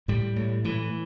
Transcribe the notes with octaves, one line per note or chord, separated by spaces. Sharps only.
A2 G3
A2
A2 E3